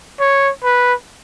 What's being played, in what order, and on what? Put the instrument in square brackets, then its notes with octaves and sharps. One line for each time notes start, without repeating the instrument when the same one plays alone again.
[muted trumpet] C#5
B4